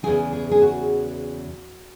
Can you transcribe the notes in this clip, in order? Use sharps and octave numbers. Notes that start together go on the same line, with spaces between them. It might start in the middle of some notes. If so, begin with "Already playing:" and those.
E2 C#3 E3 G#4
G#4
G#4
F#4